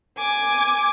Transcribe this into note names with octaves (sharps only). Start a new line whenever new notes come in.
G#5 D6